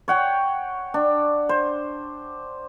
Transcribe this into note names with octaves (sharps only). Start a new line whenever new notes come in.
C#5 F#5 G5
D4
C5